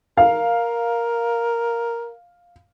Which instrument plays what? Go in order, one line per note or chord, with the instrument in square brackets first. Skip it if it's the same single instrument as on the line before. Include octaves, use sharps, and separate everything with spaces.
[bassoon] A#4 [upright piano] F5